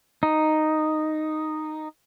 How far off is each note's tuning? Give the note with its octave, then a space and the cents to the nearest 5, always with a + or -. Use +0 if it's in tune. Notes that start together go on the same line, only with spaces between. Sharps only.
D#4 -5